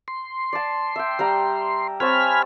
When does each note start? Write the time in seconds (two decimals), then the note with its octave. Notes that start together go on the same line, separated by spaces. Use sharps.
0.08 C6
0.53 D5 A5
0.96 E5 G5
1.19 G3 G5 A#5
2.00 C4 C#5 G#5 A5 B5 F6